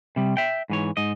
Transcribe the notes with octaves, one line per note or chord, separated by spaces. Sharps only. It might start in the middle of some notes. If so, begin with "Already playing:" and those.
C3 G3
E5 G5
G#2 E3 C#5
G#2 D#5